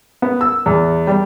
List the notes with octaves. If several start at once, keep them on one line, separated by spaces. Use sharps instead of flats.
B3
E6
E2
G3